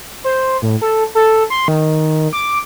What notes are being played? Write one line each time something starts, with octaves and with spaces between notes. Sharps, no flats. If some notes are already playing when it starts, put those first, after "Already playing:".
C5
A2
A4
A4
C6
D#3
D6